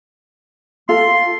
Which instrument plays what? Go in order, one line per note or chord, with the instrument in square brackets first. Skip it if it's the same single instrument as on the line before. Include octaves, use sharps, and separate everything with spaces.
[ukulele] F4 A4 [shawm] C6